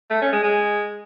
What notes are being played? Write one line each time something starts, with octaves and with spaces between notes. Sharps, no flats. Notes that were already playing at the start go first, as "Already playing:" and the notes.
A3
C#4
G#3
G#3